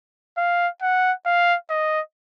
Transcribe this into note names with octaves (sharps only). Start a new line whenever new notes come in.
F5
F#5
F5
D#5